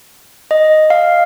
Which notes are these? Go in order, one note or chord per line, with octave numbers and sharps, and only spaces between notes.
D#5
F5